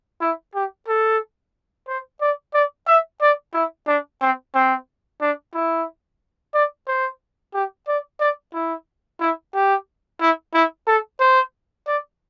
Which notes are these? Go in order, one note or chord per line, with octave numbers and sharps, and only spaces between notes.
E4
G4
A4
C5
D5
D5
E5
D5
E4
D4
C4
C4
D4
E4
D5
C5
G4
D5
D5
E4
E4
G4
E4
E4
A4
C5
D5